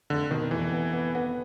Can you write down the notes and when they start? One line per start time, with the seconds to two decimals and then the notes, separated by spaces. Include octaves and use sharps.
0.10 F1 D3
0.31 B2 D#3
0.51 F1 E3
0.73 B3
0.93 B3
1.15 B3